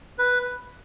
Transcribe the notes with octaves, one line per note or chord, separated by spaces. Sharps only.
B4